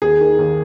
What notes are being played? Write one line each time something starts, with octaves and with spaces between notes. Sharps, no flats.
D#2 G#4
D#3
D#2